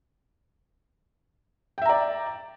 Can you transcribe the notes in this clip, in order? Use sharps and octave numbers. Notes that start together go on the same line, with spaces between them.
D5 E5 G5 A#5